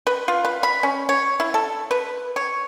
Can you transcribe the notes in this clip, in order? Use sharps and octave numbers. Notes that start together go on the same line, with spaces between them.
B4
F4
B4
B5
C#4
C#5
E4
A4
B4
C#5